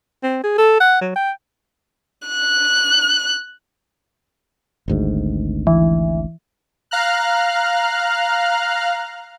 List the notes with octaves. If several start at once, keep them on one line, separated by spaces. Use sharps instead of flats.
C4
G#4
A4
F#5
F#3
G5
F#6
G#1 D2 G#2
E3
F5 A#5 F6 F#6